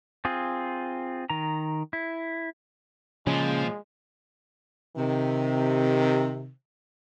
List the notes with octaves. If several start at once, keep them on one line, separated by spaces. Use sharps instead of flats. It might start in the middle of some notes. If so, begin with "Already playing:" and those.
C4 F4 G#4
D#3 A#5
E4
A#2 C#3 F3 G#3 C#4
C3 D#3